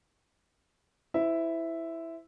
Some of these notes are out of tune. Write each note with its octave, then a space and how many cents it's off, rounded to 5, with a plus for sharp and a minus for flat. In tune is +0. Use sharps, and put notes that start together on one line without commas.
E4 +0 C5 -35 E5 +0